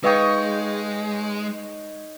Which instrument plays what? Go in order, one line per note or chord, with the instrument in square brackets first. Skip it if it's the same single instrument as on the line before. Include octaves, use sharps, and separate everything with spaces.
[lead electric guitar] G#3 [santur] D#4 C#5 D#5 [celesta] B4 F5 G5